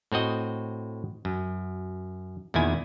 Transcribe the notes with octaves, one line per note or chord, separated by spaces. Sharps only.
A2 C4 F#4 D#5
F#2
E2 A#2 D#3 E4 G#5